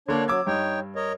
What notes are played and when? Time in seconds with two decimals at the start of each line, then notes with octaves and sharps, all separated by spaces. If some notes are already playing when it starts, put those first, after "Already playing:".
0.08 D3 A#3 D4 C#5
0.28 F#3 D6 E6 G#6
0.47 G2 D#4 C#5 G5
0.96 A#4 C#5 D#5